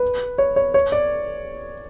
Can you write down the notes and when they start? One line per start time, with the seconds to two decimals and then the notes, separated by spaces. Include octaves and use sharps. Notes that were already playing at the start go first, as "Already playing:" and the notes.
Already playing: B4
0.38 C#5
0.56 C#5
0.74 C#5
0.92 D5